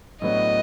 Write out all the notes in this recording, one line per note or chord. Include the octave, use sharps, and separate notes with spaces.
A2 F#3 B3 D4 F#4 D#5